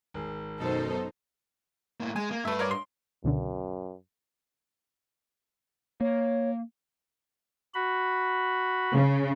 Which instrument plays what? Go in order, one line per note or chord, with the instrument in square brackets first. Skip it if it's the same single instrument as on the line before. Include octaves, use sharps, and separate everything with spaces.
[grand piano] G#1 G#4
[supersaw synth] F#2 B2 D#4 [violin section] A4 C5
[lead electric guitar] A2 A#3
[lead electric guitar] G#3 [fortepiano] G#5
[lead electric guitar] A#3
[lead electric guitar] G2 B4 [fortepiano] A3 E5
[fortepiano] A#4 C#5 D5
C6
[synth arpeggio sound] C#2 B2 D3 [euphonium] F#2
[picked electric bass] A#3 [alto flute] C#5
[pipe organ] F#4 B5
[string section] C#3